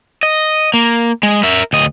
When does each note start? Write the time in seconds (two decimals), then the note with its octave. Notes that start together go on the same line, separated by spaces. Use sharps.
0.23 D#5
0.74 A#3
1.23 G#3
1.43 A#4 E5
1.73 D2 D#5